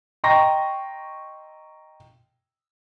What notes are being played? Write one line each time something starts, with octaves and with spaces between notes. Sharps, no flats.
D#5 G5 A#5 C6 C#6 A#6